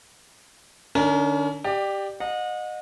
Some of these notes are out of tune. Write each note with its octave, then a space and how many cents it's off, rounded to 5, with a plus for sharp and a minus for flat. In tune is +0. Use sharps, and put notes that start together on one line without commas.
D3 +40 C#4 +40 A#4 +0
G4 +0 D5 +25
D#5 -20 F#5 -40